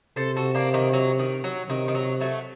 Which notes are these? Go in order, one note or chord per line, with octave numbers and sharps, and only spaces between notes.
C3 A4 C5
F#4 A4
A#3 D4
D#3
F#3
D#3
F#3
C3 D#3
D#3
F#3
F#3 A3